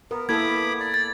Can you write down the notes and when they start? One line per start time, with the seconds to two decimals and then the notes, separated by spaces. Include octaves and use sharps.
0.11 B3 A#4
0.29 A#3 B3 E4 A4 B5 D6 G#6
0.80 D5
0.94 A6